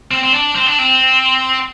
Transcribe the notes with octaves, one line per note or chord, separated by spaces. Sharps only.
C4
C4
D4
C4
D4
C4